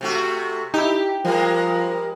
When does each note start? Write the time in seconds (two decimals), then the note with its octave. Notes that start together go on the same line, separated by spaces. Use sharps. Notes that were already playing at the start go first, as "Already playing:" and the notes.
0.01 C3 A3 F#4
0.74 D#4 E4 G4
1.25 F3 G3 G#3 A#4